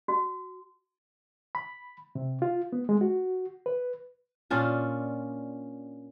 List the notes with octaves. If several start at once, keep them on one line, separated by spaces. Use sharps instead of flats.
F#4
B5
C3
F4
B3
G#3
F#4
B4
A#2 C#4 D4 F4